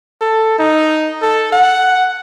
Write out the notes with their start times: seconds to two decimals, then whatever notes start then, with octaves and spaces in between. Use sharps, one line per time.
0.21 A4
0.59 D#4
1.22 A4
1.53 F#5